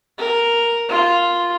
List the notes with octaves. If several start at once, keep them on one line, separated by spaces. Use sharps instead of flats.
A#4
F4